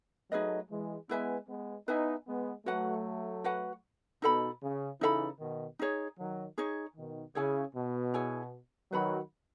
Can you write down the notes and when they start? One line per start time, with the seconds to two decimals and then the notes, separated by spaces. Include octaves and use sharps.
0.31 F#3 A3 D#4 G#4 B4 D#5
0.70 E3 G#3
1.09 G#3 B3 E4 B4 E5 G#5
1.48 G#3 B3
1.87 B3 D#4 E4 B4 E5 G#5
2.27 G#3 B3
2.66 F#3 A3 F#4 B4 F#5
3.44 F#4 B4 F#5
4.22 B2 D#4 A4 E5 B5
4.62 C#3
5.00 C#3 E3 D#4 A4 E5 B5
5.39 B2 D#3
5.79 D#4 G#4 C#5
6.19 D#3 F#3
6.58 D#4 G#4 C#5
6.96 B2 D#3
7.35 C#3 E4 G#4 C#5 G#5
7.76 B2
8.14 E4 G#4 C#5 G#5
8.92 D#3 F#3 B4 F#5 B5